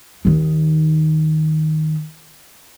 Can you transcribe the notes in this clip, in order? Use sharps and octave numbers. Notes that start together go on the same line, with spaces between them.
D#2 D#3